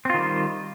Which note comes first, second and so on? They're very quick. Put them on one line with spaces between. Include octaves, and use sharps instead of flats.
C4 F4 D#3 G3